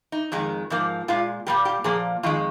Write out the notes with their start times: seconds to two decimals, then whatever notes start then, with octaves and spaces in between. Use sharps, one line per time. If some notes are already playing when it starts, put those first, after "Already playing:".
0.12 D#4
0.32 F2 D#3 G#3
0.70 G#2 F3 A#3
1.08 A#2 G#3 F4
1.46 A#2 G3 A#3 G4
1.65 G4
1.84 A#2 F3 A#3 G#4
2.23 F2 D#3 G#3 F4